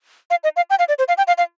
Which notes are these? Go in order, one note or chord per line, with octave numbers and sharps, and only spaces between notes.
F5
D#5
F5
G5
F5
D5
C5
F5
G5
F5
F5